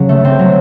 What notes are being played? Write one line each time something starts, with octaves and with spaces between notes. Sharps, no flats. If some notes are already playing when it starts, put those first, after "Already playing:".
Already playing: C#3 F#3
A3
C4
F#3